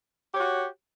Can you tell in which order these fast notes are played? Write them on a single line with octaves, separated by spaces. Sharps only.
G4 C#5 F#4